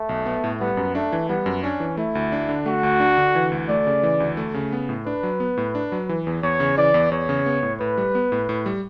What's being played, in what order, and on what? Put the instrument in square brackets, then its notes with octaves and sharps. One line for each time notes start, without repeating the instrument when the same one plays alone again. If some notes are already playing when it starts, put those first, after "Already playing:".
Already playing: [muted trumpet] A3
[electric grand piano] B1
B3
A2
[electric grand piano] G3 [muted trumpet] B3
[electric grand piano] F#2
[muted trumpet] A3 [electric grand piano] D4
[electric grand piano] E3
[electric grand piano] G3 [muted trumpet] B3
[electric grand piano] F#2
[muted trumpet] C#4 [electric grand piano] D4
[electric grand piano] E3
[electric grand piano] A3 [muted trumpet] E4
[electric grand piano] D2
D4
D3
[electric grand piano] A3 [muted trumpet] F#4
[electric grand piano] D2
D4
D3
E3
D2
[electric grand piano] A3 [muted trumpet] D5
[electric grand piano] C#3
E3
D2
A3
C#3
B3
A2
[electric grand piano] D4 [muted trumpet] B4
[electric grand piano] F#3
B3
A2
D4
F#3
E3
E2
[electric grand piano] E2 [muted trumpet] C#5
[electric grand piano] C#3
[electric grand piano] E3 [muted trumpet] D5
[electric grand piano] E2
[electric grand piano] E2 [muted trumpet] C#5
[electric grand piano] C#3
B3
A2
[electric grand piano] A2 [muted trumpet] B4
[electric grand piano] G3
B3
A2
A2
G3